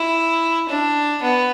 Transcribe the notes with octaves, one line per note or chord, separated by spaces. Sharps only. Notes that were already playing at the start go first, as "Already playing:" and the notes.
Already playing: E4
D4
B3